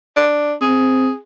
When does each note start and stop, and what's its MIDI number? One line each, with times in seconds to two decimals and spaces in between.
0.17 0.54 62
0.62 1.10 60
0.62 1.18 68